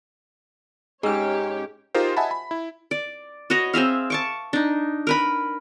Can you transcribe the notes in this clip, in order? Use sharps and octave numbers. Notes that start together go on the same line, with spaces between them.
G#2 C#4 G4 G#4 C#5 F6
D#4 F4 G4 G#4 A#4 C5
D#5 E5 F#5 G#5 A5 B5
B5
E4
D5
F#4 B4 C#5 D#5
C4 G#4 E5 F5
A5 C#6 D6
D4 D#4
A#4 B4 B5